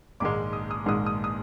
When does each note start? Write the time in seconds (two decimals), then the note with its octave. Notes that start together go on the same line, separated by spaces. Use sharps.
0.20 A#1 G#2 D#3 G#3 D6
0.53 D#6
0.71 D#6
0.86 A#1 G#2 D#3 G#3 D#6
1.06 D#6
1.24 D#6